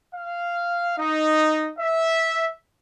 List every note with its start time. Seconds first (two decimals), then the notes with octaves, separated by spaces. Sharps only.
0.14 F5
0.97 D#4
1.78 E5